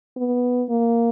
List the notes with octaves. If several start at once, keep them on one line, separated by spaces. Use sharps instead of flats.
B3
A#3